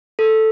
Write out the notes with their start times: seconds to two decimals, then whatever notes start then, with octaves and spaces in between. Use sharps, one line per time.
0.19 A4